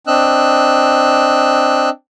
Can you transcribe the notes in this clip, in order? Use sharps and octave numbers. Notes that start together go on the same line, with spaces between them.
C4 D4 D#5 E6 F#6